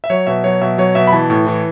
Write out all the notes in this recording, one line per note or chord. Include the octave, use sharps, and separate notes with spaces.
E5
F#3 C#5
B2 E5
F#3 C#5
B2 E5
F#3 C#5
B2 E5
B5
E3 A5
A2
E3